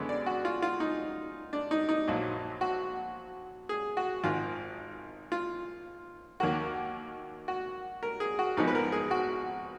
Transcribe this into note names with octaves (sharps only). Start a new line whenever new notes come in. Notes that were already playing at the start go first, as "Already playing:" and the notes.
Already playing: F#2 D3 G#3 B3
D5
F#4
F4
F4
D#4
D4
D#4
D#4
A#1 A#2 F#3
F#4
G#4
F#4
G#1 G#2 D#3 F4
F4
D#2 D#3 F#3 A#3 F#4
F#4
A#4
G#4
F#4
G#1 G#2 F3 B3 D#4
B4
A#4
G#4
F#4